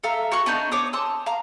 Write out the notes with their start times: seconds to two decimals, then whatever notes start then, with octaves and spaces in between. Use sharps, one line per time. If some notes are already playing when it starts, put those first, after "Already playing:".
0.04 A4 E5 F5 A#5
0.32 F#4 C#5 F5 C#6
0.46 B3 D4 D#4 G6
0.72 C#5 D6 D#6
0.93 A5 C6 D#6 E6
1.26 F5 A#5